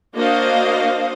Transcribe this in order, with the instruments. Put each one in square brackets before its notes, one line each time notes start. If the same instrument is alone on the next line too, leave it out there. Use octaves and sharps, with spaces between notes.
[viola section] A#3 D4 F#4 C5 D#5 F5